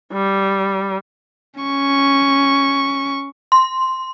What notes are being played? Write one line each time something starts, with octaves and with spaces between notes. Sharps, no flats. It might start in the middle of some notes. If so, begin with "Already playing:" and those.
G3
C#4 C#6
C6